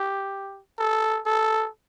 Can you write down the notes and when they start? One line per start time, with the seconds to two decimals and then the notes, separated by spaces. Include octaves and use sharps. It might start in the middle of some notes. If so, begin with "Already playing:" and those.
Already playing: G4
0.78 A4
1.25 A4